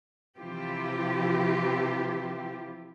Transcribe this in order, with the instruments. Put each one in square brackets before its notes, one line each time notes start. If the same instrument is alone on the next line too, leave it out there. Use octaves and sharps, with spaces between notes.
[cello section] C3 E3 F3 E4 F4 G4